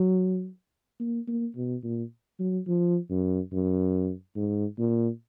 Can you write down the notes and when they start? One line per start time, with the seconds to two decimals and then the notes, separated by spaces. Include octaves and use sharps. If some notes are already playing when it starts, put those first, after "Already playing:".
Already playing: F#3
1.00 A#3
1.28 A#3
1.56 B2
1.84 A#2
2.40 F#3
2.68 F3
3.10 F#2
3.53 F#2
4.36 G#2
4.79 A#2